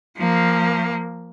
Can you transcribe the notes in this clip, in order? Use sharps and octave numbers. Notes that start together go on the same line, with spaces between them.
F3 A#3